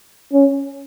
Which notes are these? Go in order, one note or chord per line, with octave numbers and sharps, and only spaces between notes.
C#4